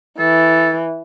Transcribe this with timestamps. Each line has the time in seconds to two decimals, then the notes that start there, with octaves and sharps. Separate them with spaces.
0.19 E3 A4